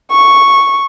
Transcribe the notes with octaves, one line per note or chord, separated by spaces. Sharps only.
C#6